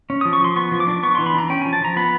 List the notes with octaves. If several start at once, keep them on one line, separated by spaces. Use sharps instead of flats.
C#4
F3 D#6
C#6
F3 C6
B3 C#6
F3
D6
D4
B3 C#6
E3 C6
B5
D4 A#5
C#4 G5
F3 G#5
A5
F3 A#5
B3 B5